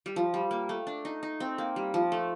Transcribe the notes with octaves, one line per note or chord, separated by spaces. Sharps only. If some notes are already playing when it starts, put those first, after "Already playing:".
G3
F3
G3
A#3
A3
D4
D#4
D#4
C4
A#3
G3
F3
A3